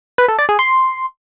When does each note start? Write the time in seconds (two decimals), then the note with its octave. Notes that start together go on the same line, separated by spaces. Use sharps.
0.18 B4
0.28 A4
0.39 D5
0.49 G#4
0.59 C6